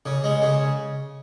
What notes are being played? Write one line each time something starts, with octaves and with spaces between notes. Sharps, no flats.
C#3
G#3
C#3